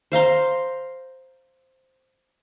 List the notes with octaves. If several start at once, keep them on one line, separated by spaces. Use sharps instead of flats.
C5 F5 A#5 C6